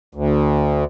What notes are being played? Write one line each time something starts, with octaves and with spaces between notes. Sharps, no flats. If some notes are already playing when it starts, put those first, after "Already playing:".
D2